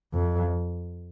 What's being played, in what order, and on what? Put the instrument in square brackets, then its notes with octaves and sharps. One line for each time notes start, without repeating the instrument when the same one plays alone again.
[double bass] F2